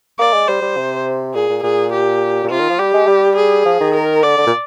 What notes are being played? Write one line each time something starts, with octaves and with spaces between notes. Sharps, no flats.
A#3 D5
G#3
G3 C5
G3
C3
A#2 G#4
A#2
A#2 G#4
G4
A#2
C3 F4
D#3
F3
G3 G4
G#3
G3
G#4
F3
D#3
A#4
D3 D5
D3
A#2